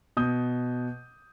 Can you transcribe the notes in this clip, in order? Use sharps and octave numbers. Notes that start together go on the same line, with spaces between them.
B2 D#6 G6